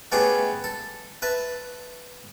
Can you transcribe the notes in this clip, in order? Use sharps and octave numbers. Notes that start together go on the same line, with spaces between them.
A3 B3 C#4 E4 G4 G#4
A4
B4 E5 A5